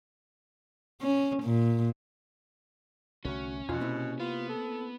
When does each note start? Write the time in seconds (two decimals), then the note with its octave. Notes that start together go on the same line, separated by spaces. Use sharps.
1.01 C#4
1.44 A#2
3.25 C2 D3 A3 C#4 F#4
3.69 E2 B2 F3 E4 F4 G#5
3.80 C3 A#3 C4 E4
4.20 B3 F4
4.49 A4